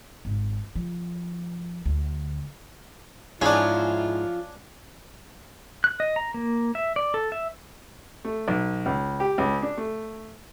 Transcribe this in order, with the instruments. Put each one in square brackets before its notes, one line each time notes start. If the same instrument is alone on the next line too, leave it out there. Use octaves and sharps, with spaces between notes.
[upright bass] G#1
F3
D2
[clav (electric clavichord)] G#2 G#4 [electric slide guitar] F3 F4 [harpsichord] C#4 D4 [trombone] E4
[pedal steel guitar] F#6
D#5
A#5
A#3
E5
D5
A4
E5
[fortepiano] A3
B1
C#2
G4
C#2
D4
A3